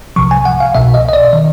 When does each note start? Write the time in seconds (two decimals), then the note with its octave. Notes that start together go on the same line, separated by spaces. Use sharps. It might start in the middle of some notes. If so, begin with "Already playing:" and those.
0.16 C2 C3 F3 C#6
0.31 G#5
0.45 F#5
0.60 F5
0.75 C2 B2 E5
0.94 D#5
1.09 D#5
1.13 D5
1.33 D#3